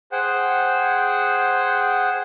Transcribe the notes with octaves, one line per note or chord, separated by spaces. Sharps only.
G#4 C5 F#5 G5